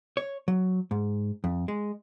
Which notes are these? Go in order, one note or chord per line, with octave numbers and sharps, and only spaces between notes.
C#5
F#3
G#2
F2
G#3